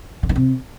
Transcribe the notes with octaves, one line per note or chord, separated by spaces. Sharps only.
D3
D#3
C3